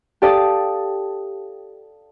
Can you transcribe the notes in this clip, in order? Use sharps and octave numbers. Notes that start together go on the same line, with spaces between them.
G4 A4 D5 F5 A5 D#6